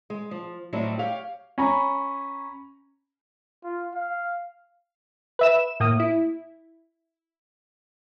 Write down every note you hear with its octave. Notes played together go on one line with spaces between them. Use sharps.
G#3
F3
A2 F#3 G3 C4 D#4 E4
G4 C#5 F5
C#4 G#5 A#5 B5
F4
F5
B4 E5 E7
A2 A#3 D#6
E4